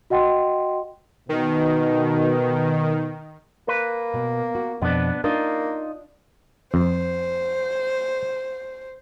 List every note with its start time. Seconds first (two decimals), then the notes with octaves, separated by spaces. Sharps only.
0.10 F#4 D#5 F#5 G5 C6
1.29 B2 D#3
3.68 A#3 B4
4.14 B2
4.55 F#4
4.82 F2 B2 B3 D4 B4
5.24 A#3 D4 D#4 F4
6.74 F2 C5